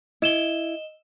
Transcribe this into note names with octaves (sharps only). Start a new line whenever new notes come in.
E4 D#5 E7 G7